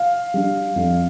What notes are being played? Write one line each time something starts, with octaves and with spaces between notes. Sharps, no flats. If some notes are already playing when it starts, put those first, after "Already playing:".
Already playing: F5
G3 D4
F2